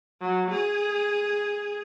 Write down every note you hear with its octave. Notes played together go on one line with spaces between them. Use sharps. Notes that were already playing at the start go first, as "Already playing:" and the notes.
F#3
G#4